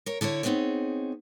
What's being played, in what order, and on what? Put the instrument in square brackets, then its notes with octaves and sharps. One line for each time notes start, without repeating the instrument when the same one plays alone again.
[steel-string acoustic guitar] A#4 C#5
D3 E4 A4 C#5
B3 C4 D#4 G#4 C#5